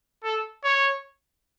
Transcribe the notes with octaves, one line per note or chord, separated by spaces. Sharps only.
A4
C#5